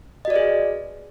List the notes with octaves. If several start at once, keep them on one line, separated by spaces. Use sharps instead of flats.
F#4 G#4 B4 D5 D#5